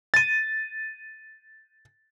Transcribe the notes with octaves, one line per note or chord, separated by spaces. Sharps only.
A6 D#7